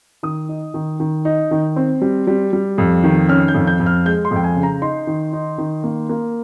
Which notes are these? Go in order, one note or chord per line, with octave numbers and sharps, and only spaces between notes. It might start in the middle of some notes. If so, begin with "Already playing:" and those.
D#3 D#6
D#4
D#3
D#3
D#4
D#3
C4
G3
G3
G3
F2
D#3
C#4 F6
G6
F2
G6
F2
F6
G#3 G6
C6
F2 G5
G#5
C#3
A#5
D#4 C6
D#3
D#4
D#3
A#3
A#3